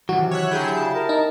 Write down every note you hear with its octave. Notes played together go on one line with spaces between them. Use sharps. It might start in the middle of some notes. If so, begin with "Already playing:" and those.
C3 D#3 E3 F#3 F#4
C#5 E5 F#6
D3 F#3 E4 G4 G#4 G6
C#3 A5
A#4
D#4